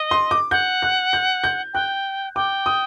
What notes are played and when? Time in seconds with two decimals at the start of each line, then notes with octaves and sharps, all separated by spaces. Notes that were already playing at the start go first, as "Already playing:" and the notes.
Already playing: D#5
0.11 C6
0.31 D6
0.51 F#5 G6
0.82 F#6
1.13 G6
1.44 G6
1.74 G5 F#6
2.35 G5 D6
2.66 D#6